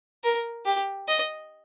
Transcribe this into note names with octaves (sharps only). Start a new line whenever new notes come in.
A#4
G4
D#5